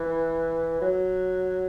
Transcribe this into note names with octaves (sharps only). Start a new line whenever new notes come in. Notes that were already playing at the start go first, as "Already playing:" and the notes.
Already playing: E3
F#3